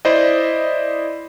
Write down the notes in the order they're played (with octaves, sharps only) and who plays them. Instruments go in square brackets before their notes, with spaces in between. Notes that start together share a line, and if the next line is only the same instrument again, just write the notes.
[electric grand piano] E4 C5 D5 D#5